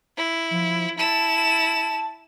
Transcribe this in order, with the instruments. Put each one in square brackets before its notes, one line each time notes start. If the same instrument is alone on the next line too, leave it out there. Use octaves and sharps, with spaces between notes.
[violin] E4
[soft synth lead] F3
[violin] E4 E7 [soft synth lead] A5